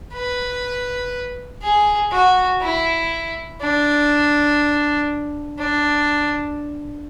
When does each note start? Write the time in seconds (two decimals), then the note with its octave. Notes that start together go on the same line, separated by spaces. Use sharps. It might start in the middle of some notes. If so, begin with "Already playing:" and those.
0.14 B4
1.62 G#4
2.12 F#4
2.61 E4
3.61 D4
5.59 D4